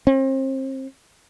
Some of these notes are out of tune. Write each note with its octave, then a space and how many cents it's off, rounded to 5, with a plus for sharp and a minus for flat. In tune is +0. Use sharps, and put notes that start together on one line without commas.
C4 +35